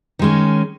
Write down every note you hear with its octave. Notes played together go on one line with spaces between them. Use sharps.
D#3 G#3 C#4